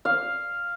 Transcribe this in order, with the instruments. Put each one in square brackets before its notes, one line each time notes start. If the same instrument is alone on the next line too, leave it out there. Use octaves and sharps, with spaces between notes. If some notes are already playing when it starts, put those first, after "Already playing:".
[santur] F5